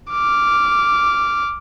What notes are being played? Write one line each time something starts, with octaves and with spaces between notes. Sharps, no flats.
D6 F6